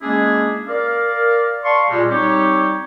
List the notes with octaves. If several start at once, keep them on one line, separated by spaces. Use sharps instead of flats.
G#3 A#3 C#4 D4 E4 G#4
A#4 D5 F5
D5 F5 A5 C6 C#6
A#2 G3 G#3
G3 C4 D#4 G4 C#5